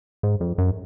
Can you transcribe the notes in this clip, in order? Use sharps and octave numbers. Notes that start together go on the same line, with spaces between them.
G#2
F2
F#2